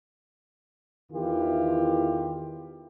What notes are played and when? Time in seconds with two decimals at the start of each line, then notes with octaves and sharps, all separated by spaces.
1.12 E2 D#3 E3 E4 F4 G4